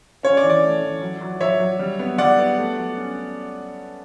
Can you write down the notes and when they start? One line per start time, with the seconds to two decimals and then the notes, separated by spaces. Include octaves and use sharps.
0.23 C#4 C#5
0.37 D5
0.44 E3
0.50 D5
0.63 A3
0.82 E3
1.02 F#3
1.21 F#3
1.41 F#3 C#5 E5
1.60 F#3
1.79 G3
1.99 B3
2.18 G3 D5 F#5
2.39 B3
2.58 A3
2.77 F#3
2.97 C#4